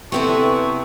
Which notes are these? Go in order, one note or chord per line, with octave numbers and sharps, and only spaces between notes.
C3 B3 C4 D4 E4 G#4 A4 C#6